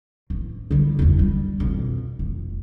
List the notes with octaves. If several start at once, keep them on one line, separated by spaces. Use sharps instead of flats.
A1
D3 G3
F#1 E2
G3
F2 B2
F1